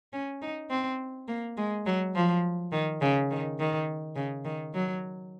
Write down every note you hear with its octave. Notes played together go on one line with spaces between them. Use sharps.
C#4
D#4
C4
A#3
G#3
F#3
F3
D#3
C#3
D#3
D#3
C#3
D#3
F#3